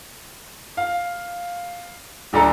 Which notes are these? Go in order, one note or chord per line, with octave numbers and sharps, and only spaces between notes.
F5
D#1 D2 D3 D4 A4 A#5